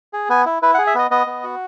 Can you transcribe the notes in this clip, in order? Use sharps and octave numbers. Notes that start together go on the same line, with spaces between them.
G#4
B3 G#5
E4
E4 B4
F#5
G#4
E5
B3 D#5
B3 D#5
B3
F#4